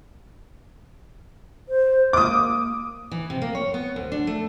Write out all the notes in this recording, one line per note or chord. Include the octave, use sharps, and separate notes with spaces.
C5
A#3 D6 D#6
E3
C3
A#3
C#5
B3
D2
D4
A3